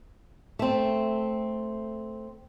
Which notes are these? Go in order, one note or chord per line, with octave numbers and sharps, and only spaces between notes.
A3 C4